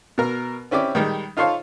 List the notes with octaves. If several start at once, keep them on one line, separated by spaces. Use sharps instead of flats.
B2 A#4
C4 C#4 E4 G4 D5
D#3 G3 G#3
D#4 F4 A4 C5 C#5 F5